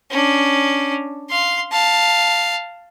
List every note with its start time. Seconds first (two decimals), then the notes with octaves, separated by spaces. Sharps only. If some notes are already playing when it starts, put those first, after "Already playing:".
0.11 C#4 D4
1.29 F5 C6
1.71 F5 A5